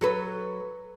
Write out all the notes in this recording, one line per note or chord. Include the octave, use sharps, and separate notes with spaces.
F#3 A4 B4